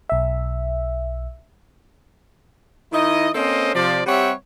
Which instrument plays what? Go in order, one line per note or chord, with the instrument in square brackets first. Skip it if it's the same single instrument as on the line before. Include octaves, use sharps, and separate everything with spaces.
[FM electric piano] B1 E5
[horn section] D#3 D#4 E4 D#5
A#3 C4 C#4 A4 C5 D#5
C3 F3 D5
G3 C4 G4 C#5 E5 F#5